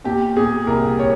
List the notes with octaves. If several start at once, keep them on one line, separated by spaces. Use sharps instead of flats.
A#2 G4
A#2 G#4
C2 A#4
C#5